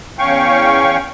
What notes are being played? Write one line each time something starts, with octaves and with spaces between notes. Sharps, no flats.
E2 C#4 F5 G5 C#6